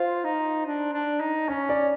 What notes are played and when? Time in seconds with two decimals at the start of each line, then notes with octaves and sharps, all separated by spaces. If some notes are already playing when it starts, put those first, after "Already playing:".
Already playing: F4 C5
0.24 D#4
0.66 D4
0.93 D4
1.20 D#4
1.48 C#4 C#5
1.69 D5